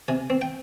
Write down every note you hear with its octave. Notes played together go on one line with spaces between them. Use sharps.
C3 G#5
C4
G5